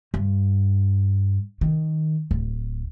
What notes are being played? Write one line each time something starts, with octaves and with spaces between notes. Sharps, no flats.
G2
D#3
D1